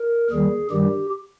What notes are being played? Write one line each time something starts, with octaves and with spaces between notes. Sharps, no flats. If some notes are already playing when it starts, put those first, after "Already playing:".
Already playing: A#4
D#2 D#3 G3 G#4
G2 D#3 G3 G4